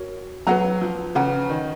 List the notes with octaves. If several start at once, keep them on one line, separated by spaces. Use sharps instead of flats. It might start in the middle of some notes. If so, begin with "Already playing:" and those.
Already playing: F#4 A#4 C#5
F#3 B4 F#5 A#5
F3
C#3 B4 F#5 A#5
D#3